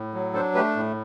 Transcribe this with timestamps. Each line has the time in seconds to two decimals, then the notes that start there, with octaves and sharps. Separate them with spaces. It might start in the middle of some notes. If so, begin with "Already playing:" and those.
Already playing: A2
0.14 F#3
0.34 D4 A4 C5
0.55 A3 G4 B4
0.76 A2